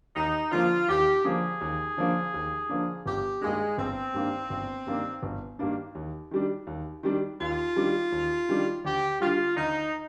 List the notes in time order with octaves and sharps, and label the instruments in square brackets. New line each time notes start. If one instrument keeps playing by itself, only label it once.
[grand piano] D#2 [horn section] D#4
[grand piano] D3 F3 A#3 D4 [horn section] F4
[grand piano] D#2 [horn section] G4
[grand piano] D3 F3 A#3 D4 [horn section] G#4
[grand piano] D#2
D3 F3 A#3 D4
D#2
D3 F3 A#3 D4
[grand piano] G1 [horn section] G4
[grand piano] G2 D#3 A#3 D4 [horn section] G#3
[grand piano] G1 [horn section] C4
[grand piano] G2 D#3 A#3 D4
G1
G2 D#3 A#3 D4
G1
G2 D#3 A#3 D4
D#2
D#3 G3 D4
D#2
D#3 G3 D4
[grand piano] D#2 [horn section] F4
[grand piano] D#3 G3 D4
D#2
D#3 G3 D4
[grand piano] D2 [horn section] G4
[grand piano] D3 G3 [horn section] F4
[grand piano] D2 [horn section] D#4